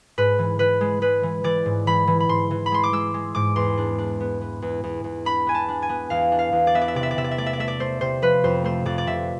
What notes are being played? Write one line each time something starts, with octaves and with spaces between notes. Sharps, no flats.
G#2 B4
E3
E3 B4
G#3
G#3 B4
E3
E3 D5
G#2
E3 B5
E3
B5
G#2 C6
E3
B5
G#3 C6
D6
G#3 E6
G#3
G#2 D6
E2 C6
D4
D4
B3
B3
E2
E2
E2
D4 B5
B3 G#5
A5
D4
G#5
B3
E2 F5
D4
F5
E2
D5
B3 E5
D5
E5
C3 D5
E5
D5
C3 E5
D5
E5
A3 D5
E5
D5
A3 E5
D5
A3 C5
C3 C5
F3 B4
F2 C5
A3 C5
F2 D5
D5
C3 E5